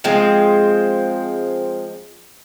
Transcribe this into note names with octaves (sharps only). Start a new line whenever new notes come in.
F3 G#3 C4